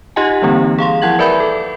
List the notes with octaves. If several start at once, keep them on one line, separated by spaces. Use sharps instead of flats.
D#4 F4 G4 D#5 F#5 G#5
D3 E3 G3 A#3 C4 D#4
G#4 F5 C6
F3 E4 F#5 G#6 F#7
A#4 B4 D5 E5 B5 G6
A4